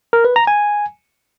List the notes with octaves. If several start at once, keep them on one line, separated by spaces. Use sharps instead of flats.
A#4
B4
A#5
G#5